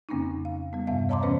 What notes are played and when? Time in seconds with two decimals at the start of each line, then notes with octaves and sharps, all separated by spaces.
0.09 F2 C#3 A#3 C4 C#4 D#4
0.45 F5
0.73 G3 B3
0.87 E2 G2 C3 B3 E5 F5
1.09 C#5 D#5 A5 A#5 C6 D6
1.22 C3 E3 B3 C#4 B4 C5